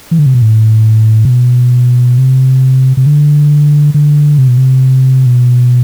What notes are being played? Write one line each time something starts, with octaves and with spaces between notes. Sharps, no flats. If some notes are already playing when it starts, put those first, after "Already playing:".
E3
D3
C3
B2
A2
C3
B2
C3
C3
D3
D3
C3
B2
C3
B2